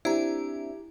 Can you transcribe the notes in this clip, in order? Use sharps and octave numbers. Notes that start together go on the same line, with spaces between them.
C4 D4 E4 G4 E5 G#5 A#5